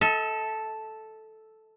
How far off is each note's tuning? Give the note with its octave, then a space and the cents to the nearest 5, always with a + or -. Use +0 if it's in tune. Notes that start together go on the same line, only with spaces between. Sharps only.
A4 -5 D#5 +45